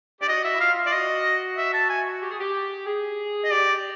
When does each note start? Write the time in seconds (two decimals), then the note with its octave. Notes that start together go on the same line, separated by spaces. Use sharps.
0.21 G4 D5
0.28 F#4 D#5
0.44 E5
0.55 E4
0.60 F4 F5
0.83 F4 D5
0.92 F#4 D#5
1.57 E5
1.74 A5
1.90 G#5
2.22 G4
2.31 G#4
2.40 G4
2.86 G#4
3.44 D#5
3.51 G4 D5